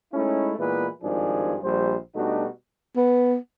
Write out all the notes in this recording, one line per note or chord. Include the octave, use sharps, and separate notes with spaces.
G#3 A3 C#4 D#4 E4
A#2 E3 G#3 B3 E4 B4
G#1 G2 D#3 F3 D4 G#4
A#1 G3 C5
B2 G3 A3 D4 D#4 F#4
B3